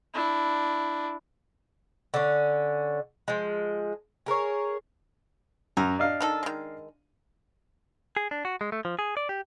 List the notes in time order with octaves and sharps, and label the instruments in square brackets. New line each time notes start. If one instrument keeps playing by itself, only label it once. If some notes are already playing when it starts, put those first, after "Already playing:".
[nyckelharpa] D4 E4
[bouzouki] D3 C#4
F3 G#3
G#4 A#4 B4 C#5
[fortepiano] F#2 [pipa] A#4
[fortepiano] D4 D#5 F5
[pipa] D#3 D#4 A4
D#3 G#3
[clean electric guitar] G#4
D4
F#4
G#3
A3
F3
G#4
D5
G4